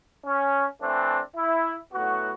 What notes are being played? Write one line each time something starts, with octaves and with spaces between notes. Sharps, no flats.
C#4
E3 A3 C4 D4
E4
A2 F#3 B3 F#4